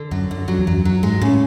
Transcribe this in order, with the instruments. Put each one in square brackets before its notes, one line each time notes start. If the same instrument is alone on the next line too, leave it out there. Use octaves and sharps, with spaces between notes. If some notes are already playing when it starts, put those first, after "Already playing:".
Already playing: [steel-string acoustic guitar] D3
[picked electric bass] F#2 [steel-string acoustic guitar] F#3
[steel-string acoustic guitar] D3
[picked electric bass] F#2 [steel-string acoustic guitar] F#3
[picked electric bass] E2
[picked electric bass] F#2 [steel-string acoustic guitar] F#3
[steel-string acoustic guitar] F#3
[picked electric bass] G#2 [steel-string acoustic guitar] G#3
[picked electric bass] A2 [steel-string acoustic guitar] C#3